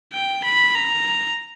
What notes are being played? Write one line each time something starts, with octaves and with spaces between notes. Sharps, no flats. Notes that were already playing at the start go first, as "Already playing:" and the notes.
G5
B5
A#5